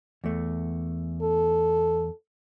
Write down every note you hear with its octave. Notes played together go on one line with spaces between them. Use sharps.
E2 A3
A4